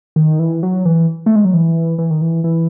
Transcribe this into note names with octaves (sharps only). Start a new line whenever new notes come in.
D#3
E3
F#3
E3
A3
G#3
F#3
E3
E3
D#3
E3
E3